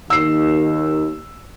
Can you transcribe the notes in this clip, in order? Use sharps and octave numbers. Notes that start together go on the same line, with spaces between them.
D#2 E6 C7